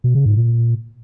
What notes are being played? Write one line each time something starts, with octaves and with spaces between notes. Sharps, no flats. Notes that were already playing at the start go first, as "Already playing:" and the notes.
B2
C#3
G#2
A#2